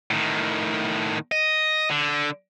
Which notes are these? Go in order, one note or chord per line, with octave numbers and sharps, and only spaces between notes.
A2 D#3
D#5
D3